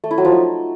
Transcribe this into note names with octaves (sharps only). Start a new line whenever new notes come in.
A3
E4
F#3
F3
D#4